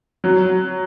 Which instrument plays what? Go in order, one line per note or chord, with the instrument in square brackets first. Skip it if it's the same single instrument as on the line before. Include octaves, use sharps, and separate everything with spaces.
[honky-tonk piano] F#3